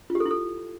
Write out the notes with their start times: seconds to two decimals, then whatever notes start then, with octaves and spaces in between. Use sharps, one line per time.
0.10 F4
0.15 G4
0.20 A4
0.26 E4
0.31 A4